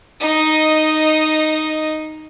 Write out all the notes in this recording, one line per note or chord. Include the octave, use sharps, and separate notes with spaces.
D#4 D#5